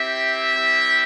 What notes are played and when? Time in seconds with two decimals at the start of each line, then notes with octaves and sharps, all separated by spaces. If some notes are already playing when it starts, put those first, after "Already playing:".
Already playing: C4 E4 G4 E5
0.54 G3 C4 E4 G4